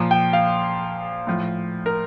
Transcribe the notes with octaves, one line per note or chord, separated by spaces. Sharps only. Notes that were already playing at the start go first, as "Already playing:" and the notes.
Already playing: A#2 F3
G5
F5
A2 F3
A#4